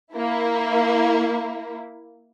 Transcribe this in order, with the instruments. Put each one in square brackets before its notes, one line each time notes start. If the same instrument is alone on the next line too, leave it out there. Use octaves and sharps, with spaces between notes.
[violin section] A#3 E4